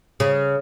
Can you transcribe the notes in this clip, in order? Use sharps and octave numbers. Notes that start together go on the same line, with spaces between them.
C#3